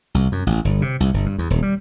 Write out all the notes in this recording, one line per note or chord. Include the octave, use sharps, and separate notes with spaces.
C2
F#2
A1
G1
C3
C2
G1
G2
E2
D#1
G3